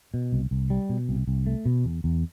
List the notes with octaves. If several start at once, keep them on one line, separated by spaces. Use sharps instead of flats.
B2
C2
C2
G3
B2
C2
C2
A3
B2
E2
E2